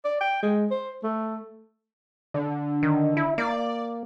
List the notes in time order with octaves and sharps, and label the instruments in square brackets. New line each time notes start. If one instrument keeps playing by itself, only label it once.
[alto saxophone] D5
G5
G#3
C5
A3
[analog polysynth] D3
[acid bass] D#3
E4
[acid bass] A#3 [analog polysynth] D5